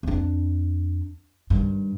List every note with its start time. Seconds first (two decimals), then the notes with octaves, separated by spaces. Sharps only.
0.03 F2 D4
1.50 G2 D#3